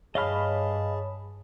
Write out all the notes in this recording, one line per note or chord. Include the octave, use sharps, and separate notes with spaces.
G2 G#4 C#5 D#5 F5 A5 B5 F6